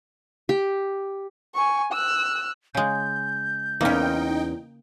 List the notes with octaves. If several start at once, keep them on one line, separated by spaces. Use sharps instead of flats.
G4
G#5 C#6
E6 F#6
C#3 G#3 G6
E2 A#3 C#4 D#4 G5